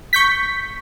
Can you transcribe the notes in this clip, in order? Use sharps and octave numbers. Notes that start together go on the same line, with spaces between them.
C#6 G6 B6